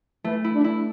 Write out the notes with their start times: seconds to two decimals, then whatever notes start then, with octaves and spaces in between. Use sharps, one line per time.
0.24 E3 A3
0.44 E4
0.54 D4
0.64 E4